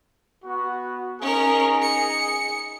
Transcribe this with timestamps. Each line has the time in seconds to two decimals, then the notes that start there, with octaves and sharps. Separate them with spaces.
0.45 B3 F#4
1.22 C#4 D#4 G#4 A#4
1.82 C#7